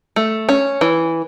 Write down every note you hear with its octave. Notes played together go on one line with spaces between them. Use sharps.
A3
C#4
E3